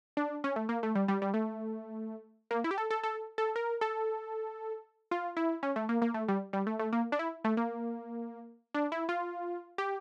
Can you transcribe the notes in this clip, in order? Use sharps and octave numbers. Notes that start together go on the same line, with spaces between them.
D4
C#4
A3
A#3
A3
G3
G3
G3
A3
A#3
E4
G4
A4
A4
A4
A4
A#4
A4
F4
E4
C#4
A3
A#3
A#3
A3
G3
G3
A3
A3
A#3
D4
E4
A3
A#3
D4
E4
F4
G4